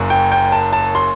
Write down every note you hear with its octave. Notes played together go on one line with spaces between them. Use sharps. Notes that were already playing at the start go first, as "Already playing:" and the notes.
Already playing: F#1 F#2
G5
G5
A5
A5
C6